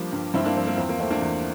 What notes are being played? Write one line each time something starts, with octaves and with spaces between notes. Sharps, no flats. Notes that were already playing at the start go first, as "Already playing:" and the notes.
Already playing: F3 G3 A#3 D4
G2
G2 C4 E4
A#3 D4
F3 C4
A#3
E2 C4
A#3
A3 C4
A#3 D4
E2